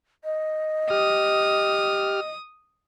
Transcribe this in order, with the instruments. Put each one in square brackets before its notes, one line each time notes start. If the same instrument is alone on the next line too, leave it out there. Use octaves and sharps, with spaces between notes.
[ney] D#5
[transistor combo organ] G4 F6 [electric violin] D#6